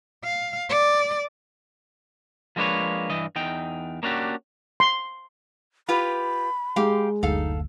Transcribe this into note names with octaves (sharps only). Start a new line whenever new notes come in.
F5
D5
F3 G#3 A#3 D4 B4 C#5
G2 E3 D#5
E2 D#4 G5
A#3 C#4 D4 F#4 G4
C6
F4 G4 B4 B5
G#3 G4 F5
F#1 D2 D#4 A4 F5